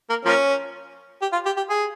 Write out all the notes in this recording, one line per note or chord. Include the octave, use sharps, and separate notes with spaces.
A#3
F3 A#3 C#4
G4
F4
G4
G4
G#4